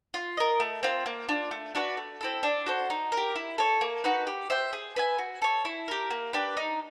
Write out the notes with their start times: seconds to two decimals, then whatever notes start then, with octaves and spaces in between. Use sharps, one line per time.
0.14 F4
0.37 A#4 D#5
0.60 A3
0.83 C4 F4
1.06 A#3
1.29 D4 F4
1.51 A3
1.75 D4 F#4 B4
1.97 A3
2.21 C4 E4 A4
2.43 D4
2.66 F#4 A4 C5
2.90 D#4
3.12 A#4
3.17 G4
3.36 E4
3.58 A4 C#5
3.81 A#3
4.04 D#4 F#4 B4
4.27 G4
4.50 C5 E5 G5
4.73 G#4
4.96 B4 E5 G#5
5.18 F#4
5.42 A4 C#5
5.65 E4
5.88 G4 A#4
6.11 A#3
6.33 D4 G4 B4
6.57 D#4